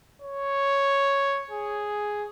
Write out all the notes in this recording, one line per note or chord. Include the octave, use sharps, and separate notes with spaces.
C#5
G#4